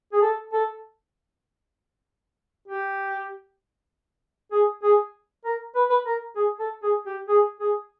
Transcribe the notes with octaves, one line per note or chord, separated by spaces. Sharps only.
G#4
A4
A4
G4
G#4
G#4
A#4
B4
B4
A#4
G#4
A4
G#4
G4
G#4
G#4